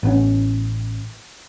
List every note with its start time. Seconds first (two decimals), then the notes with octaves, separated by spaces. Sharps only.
0.03 A1 B3 C#4